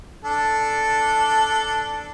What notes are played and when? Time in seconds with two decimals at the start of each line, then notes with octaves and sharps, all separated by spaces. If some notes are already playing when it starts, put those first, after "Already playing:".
0.24 D4 A4